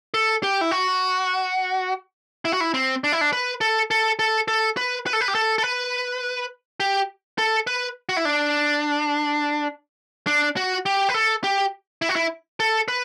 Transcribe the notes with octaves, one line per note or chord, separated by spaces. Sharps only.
A4
G4
E4
F#4
E4
F#4
E4
C4
D4
E4
D4
B4
A4
A4
A4
A4
B4
B4
A4
B4
G4
A4
A4
B4
G4
A4
B4
F#4
E4
D4
D4
F#4
G4
B4
A4
G4
E4
F#4
E4
A4
B4